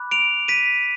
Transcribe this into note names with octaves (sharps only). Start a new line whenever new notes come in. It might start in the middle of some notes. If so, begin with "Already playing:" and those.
Already playing: B5 D6 F#6
D7 F7
B6 D#7